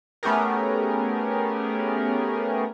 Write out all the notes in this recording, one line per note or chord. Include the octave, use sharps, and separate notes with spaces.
A3 B3 C#4 G4 G#4 A#4